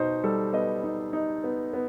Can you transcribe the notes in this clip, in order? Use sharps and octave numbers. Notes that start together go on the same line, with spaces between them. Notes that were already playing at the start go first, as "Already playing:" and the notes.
Already playing: B2 D#4 C5
G3 A4
B3 D#5
D#4
D#4
B3
B3